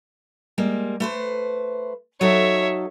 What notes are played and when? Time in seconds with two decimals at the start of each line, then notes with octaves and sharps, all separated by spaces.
0.58 G3 G#3 A#3
1.00 A3 B4 C5
2.21 F#3 D#4 A4 C#5 E5